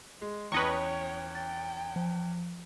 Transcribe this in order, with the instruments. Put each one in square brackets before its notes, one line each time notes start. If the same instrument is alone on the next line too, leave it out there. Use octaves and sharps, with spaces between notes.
[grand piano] G#3
[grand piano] E2 C#4 F#7 [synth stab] B4 D#5 C#6 [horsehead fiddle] C#5 G5
[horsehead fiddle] G5 [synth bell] A6
[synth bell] F3